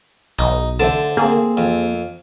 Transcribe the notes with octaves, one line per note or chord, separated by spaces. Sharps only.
B1 D#4
D3 A4 C5 E5 A5
A#3 C4 G#4
F2